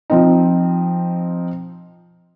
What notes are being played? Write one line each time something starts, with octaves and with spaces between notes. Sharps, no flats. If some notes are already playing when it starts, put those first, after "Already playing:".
F3 C4 D#4